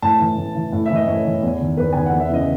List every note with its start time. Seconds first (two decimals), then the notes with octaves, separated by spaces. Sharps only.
0.02 A2 A5
0.20 E3
0.37 A2
0.55 E3
0.72 A2
0.86 E3 E5
0.95 D#5
1.07 A2 C#5
1.25 E3
1.43 E2
1.60 D#3
1.77 E2 B4
1.93 D#3 G#5
2.06 F#5
2.13 E2
2.20 E5
2.30 C#3 E3 D#5